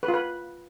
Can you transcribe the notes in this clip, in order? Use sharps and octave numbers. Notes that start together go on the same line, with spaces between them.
B4
F4
B4